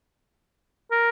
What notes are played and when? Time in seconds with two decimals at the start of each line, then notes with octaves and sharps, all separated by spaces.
0.92 A#4